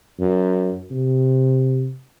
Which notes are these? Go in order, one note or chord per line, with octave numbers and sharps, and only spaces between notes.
F#2
C3